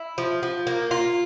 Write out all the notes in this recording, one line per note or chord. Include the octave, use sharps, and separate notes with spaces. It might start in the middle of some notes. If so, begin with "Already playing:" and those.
Already playing: E4
F3
F3
A#3
F4